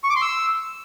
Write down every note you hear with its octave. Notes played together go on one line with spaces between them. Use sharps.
C#6
D6
C6
E6